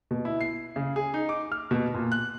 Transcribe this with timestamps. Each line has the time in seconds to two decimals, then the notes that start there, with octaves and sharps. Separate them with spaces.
0.11 B2
0.25 E4
0.41 C7
0.76 C#3
0.96 G#4
1.14 D#4
1.29 D6
1.52 F6
1.71 B2
1.94 A#2
2.12 F#6